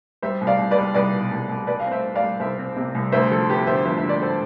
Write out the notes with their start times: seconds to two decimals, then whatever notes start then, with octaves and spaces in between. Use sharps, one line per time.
0.22 G3 C5 E5
0.41 C2
0.47 D5 F5
0.59 C2
0.71 B4 D5
0.77 G3
0.94 C2 B4 D5
1.13 B2
1.31 C2
1.49 C2
1.67 G3 B4 D5
1.80 F5
1.86 C4
1.91 C5 E5
2.04 C4
2.16 D5 F5
2.21 G3
2.40 C2 C5 E5
2.58 C4
2.77 C3
2.95 C2
3.12 D2 C5 E5
3.31 F3 A4 C5
3.49 B3 G4 B4
3.67 D3 C5 E5
3.85 F3 C5 E5
3.97 E5
4.03 D3
4.09 D5
4.21 A4 C5